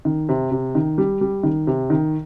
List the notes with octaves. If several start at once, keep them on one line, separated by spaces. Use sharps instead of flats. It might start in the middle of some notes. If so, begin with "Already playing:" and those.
D#3
C3
C3
D#3
G3
G3
D#3
C3
D#3